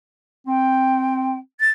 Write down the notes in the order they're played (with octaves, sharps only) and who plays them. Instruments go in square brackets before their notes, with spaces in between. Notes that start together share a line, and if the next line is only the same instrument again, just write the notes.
[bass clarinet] C4 [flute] G5
[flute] A6